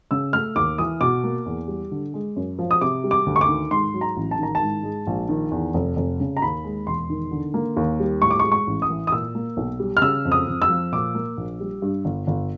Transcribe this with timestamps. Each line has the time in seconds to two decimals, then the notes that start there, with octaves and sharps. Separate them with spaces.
0.11 C#3 E6
0.33 A3 F6
0.56 D#2 D6
0.78 E3 D#6
1.01 B2 D6
1.24 A#3
1.46 E2
1.68 G3
1.91 D3
2.14 G#3
2.36 F#2
2.59 F3
2.71 D#6
2.81 C3 D6
3.04 G3
3.11 D6
3.26 D2
3.36 C#6
3.41 D6
3.49 D#3
3.71 G#2 C6
3.94 F#3
4.01 A#5
4.16 A1
4.31 A5
4.39 D#3 A#5
4.55 A5
4.62 G#2
4.83 G#3
5.07 A#1
5.29 D#3
5.52 E2
5.74 F1
5.96 F1
6.20 C#3
6.37 A#5
6.42 D#2 B5
6.64 G#3
6.87 E1 C6
7.10 D#3
7.31 D3
7.54 A#3
7.77 D#2
8.00 G3
8.22 A2 C#6
8.31 D6
8.40 C#6
8.45 G#3
8.52 C#6
8.67 A1
8.82 D#6
8.90 E3
9.07 D#6
9.12 A#2 E6
9.35 A#3
9.57 B1
9.80 G3
9.97 F6
10.02 C#3 E6
10.25 F2
10.32 D#6
10.47 F2
10.62 E6
10.70 F3
10.92 A#2 D6
11.15 A#3
11.37 A#1
11.60 G3
11.82 G2
12.05 G1
12.27 G1